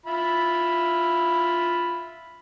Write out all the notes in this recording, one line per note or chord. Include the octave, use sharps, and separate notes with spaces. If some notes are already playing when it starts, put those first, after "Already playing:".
F4 E5 B5